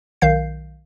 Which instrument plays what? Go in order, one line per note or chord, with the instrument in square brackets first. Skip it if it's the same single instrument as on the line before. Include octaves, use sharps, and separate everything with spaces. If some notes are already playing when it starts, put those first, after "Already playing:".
[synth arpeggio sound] B1 D#3 F5 G6 C7